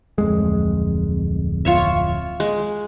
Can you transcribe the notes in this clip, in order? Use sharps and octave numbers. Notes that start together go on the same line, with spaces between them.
D1 F2 G#3
F4 C#5 E5
G#3